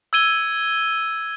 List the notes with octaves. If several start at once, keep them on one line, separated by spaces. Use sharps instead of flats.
E6 G#6 D#7 G7